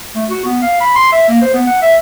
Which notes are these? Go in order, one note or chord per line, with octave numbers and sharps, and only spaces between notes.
A3
F#4
B3
F5
B5
C6
E5
A#3
C5
B3
F#5
E5